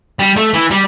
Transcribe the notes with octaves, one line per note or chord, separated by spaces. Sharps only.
G3
A3
E3
G3